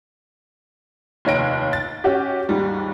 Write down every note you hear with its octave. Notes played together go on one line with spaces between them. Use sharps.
F1 D#2 C#5 A#6 D7
A6
C#4 F#4 G4
D#2 G#2 G3